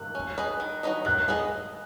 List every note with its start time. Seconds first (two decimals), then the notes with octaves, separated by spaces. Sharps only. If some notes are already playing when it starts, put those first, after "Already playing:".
Already playing: F#6
0.15 C#4
0.38 G#4 B4 D#5
0.60 D#3
0.83 F#3 D#4 B4 D#5
1.05 D#3 F#6
1.28 G#3 B3 G#4 D#5